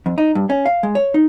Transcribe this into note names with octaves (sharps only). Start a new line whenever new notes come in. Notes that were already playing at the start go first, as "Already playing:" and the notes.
F2
D#4
G2
C#4
F5
G#3
C#5
D#4